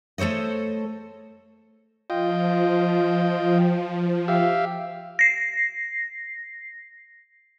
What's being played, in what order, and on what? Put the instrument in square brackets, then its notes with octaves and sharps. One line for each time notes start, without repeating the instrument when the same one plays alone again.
[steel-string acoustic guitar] A3 A4 C5 C#5 D#5
[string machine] F3 [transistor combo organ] F4 D#5 G5
[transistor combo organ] G4 E5 F5
[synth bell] A#6 C7